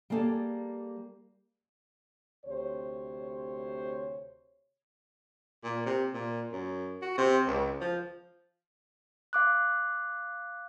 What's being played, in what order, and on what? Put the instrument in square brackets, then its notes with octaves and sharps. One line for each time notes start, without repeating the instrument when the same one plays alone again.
[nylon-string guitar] G3 A#3 G#4 A4 D5
[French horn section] D2 C3 C5 C#5
[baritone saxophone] A#2
C3
A#2
F#2
F#4
C3
C#2
F3
[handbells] F5 D6 F#6